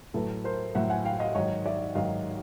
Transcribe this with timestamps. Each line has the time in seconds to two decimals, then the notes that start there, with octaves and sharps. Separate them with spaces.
0.14 A2 F#3 A4 B4
0.44 A#4 C5
0.75 A2 F#3 E5 F#5
0.90 F#5 G#5
1.05 F5 G5
1.20 D#5 F5
1.35 G#2 D#3 F#3 C#5 D#5
1.66 D5 E5
1.95 G#2 D#3 F#3 D#5 F5